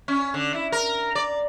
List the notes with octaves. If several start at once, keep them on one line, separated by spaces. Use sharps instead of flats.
C#4
D3
E4
A#4
D5